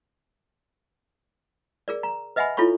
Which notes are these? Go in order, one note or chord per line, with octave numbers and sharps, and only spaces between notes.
G#4 A#4 D5
A#5
B4 D#5 E5 F#5 G#5 B5
E4 F4 A4 C#5 B5 C#6